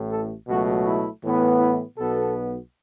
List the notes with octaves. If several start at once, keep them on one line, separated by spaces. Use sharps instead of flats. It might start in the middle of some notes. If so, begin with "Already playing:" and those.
Already playing: A1 A2 A3
A4
C#2 B2 F#3 A3 F#4
E4
A2 E3 B3
E4
B1 B2 B3 A4